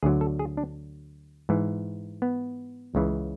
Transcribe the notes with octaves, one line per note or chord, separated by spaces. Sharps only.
D2 D3 F#3 G#4
A4
G#4
D4
G#2 E3
B3
C#2 C#3 E3